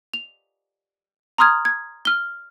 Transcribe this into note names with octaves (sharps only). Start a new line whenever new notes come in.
F7
A#5 C6 D#6 F6 G#6
G#6
F6 G7